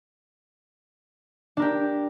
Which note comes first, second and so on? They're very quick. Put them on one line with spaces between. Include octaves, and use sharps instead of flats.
D4 A#4 G4